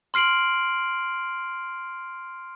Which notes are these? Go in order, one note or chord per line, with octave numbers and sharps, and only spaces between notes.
C6 F6 C7 D7 F#7